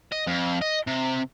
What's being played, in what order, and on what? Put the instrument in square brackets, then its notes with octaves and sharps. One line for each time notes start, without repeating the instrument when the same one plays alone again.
[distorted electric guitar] D#5
F2
D#5
C3